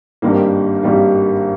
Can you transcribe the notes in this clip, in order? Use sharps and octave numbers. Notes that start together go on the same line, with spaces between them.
G#1 G2 D#3 G3 A#3
G#1 G2 D#3 G3 A#3